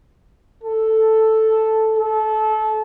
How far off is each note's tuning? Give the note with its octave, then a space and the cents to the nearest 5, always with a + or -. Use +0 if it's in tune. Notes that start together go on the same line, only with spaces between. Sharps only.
A4 +0
A4 -25